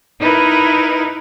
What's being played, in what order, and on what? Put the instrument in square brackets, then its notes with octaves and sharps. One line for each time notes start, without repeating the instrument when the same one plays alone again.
[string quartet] D#4 E4 A#4 B4